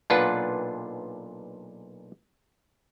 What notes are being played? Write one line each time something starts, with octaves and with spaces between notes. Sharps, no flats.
B1 A#2 D4 F4 B4 F#5